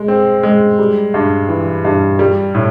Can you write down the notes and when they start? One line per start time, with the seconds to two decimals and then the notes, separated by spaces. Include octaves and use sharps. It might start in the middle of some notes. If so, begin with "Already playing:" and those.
Already playing: G#3
0.08 C4
0.43 G#3
0.79 G3
1.14 G2
1.49 E3
1.85 G2
2.19 G3
2.55 A2